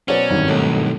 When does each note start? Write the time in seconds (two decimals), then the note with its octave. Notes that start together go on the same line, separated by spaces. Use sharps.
0.08 B2 F#3 C#4 C5 D5
0.30 G#1 G2 D#3
0.48 B1 A2